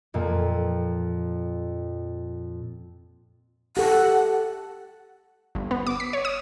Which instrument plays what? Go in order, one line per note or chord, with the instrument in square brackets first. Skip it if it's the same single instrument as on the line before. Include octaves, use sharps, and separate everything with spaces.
[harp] F2 A#2 A#3
[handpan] G4 A4 [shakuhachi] F#5
[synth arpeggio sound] G1
B3
D6
B6
C#5
D#6